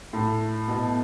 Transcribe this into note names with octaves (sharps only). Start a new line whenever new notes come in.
A2
B2